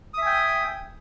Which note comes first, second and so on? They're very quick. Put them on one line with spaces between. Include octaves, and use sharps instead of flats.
D#6 E5 G#5 G5